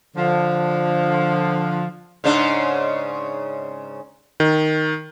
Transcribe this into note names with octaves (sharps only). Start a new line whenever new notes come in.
D3 F3
G#2 C#3 D4
D#3